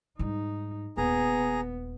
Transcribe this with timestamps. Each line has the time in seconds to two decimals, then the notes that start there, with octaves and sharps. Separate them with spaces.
0.19 G#2 G3 D#4
0.97 D#1 B3 G#4 A#5